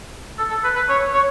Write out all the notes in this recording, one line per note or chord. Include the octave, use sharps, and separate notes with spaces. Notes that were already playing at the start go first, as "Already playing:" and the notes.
A4
A4
B4
B4
C#5
C#5